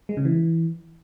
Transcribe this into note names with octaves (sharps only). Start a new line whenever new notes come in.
G#3
C#3
E3